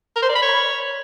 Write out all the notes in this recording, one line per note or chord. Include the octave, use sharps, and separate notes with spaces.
A#4
C5
D5
B5
C#5